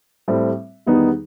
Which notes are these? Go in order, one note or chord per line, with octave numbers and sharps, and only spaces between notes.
A2 G3 C4
E2 D#3 G3 B3 D#4